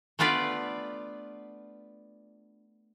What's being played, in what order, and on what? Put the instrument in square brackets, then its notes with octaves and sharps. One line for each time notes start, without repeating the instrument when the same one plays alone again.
[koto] A3 B3 D4 F4 B4 D5